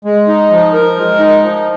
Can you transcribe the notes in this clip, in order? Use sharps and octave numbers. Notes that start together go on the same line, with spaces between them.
G#3
D#4
F3
A#4
G#3
D#4
F3